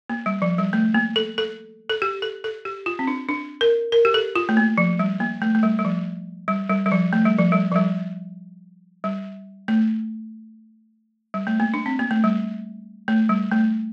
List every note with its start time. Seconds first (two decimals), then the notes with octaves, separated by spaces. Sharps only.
0.09 A#3
0.26 G3
0.42 F3
0.58 G3
0.73 A3
0.94 A#3
1.16 A4
1.38 A4
1.90 A4
2.02 G4
2.22 A4
2.44 A4
2.65 G4
2.86 F4
2.99 C4
3.07 D4
3.29 D4
3.61 A#4
3.92 A#4
4.05 G4
4.14 A4
4.36 F4
4.49 A3
4.57 A#3
4.78 F3
4.99 G3
5.20 A#3
5.42 A3
5.55 A3
5.63 G3
5.79 G3
5.85 F3
6.48 G3
6.70 G3
6.86 G3
6.92 F3
7.13 A3
7.25 G3
7.39 F3
7.52 G3
7.72 F3
7.76 G3
9.04 G3
9.68 A3
11.34 G3
11.47 A3
11.60 A#3
11.74 D4
11.86 C4
11.99 A#3
12.11 A3
12.24 G3
13.08 A3
13.29 G3
13.52 A3